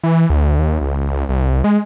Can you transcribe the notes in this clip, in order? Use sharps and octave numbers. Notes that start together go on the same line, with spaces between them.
E3
D2
D#2
C#2
C#2
C2
G#3